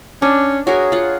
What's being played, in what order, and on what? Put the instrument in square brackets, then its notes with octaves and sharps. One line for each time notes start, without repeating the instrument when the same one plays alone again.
[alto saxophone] C#4 [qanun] D4
[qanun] F#4 G#4 A#4 [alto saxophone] C#5
[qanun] F4 F#5